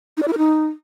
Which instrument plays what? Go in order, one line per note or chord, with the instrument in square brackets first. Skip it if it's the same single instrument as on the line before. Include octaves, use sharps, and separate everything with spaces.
[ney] D#4
D5
E4
A#4
D#4